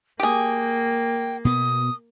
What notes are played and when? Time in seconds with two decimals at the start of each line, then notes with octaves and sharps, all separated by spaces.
0.20 A#3 G4 G#4 G5
1.45 B2 B3 D#6